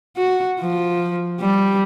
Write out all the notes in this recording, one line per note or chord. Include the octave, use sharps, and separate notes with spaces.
F#4
F3
G3